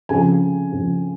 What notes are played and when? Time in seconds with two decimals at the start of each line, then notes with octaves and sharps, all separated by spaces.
0.09 F2 C#3 F3 G#5
0.72 F2 C#3 F3